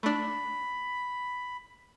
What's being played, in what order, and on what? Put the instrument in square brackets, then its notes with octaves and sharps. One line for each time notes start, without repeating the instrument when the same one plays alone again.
[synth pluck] A3 D4 [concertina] B5